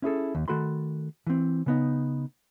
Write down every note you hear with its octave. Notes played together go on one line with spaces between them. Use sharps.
C#4 E4 G#4 A4
D#2
D#3 A3 F#4 A4 B5 C6
E3 C4
C#3 B3 D#4